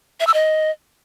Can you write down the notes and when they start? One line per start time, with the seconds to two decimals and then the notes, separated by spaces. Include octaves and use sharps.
0.20 E5
0.27 E6
0.34 D#5